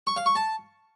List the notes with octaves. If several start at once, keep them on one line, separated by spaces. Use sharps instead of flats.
C#6
F5
C#6
A5